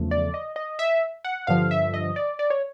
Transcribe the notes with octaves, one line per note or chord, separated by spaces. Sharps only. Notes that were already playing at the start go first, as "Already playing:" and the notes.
Already playing: E2 C#3 F3 A3
D5
D#5
D#5
E5
F#5
G2 D3 F3 F5
E5
D#5
D5
D5
C#5